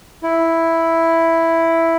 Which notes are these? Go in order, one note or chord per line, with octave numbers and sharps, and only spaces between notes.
E4